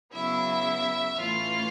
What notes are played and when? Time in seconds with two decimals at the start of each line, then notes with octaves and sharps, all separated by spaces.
0.14 C#3 F#3 B3 E4 E5
1.17 A2 E3 A3 C#4 F4 F5